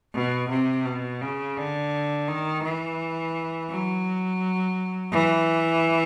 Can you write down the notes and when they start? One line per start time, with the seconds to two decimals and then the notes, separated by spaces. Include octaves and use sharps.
0.14 B2
0.50 C3
0.86 B2
1.21 C#3
1.57 D3
2.28 D#3
2.64 E3
3.71 F#3
5.12 E3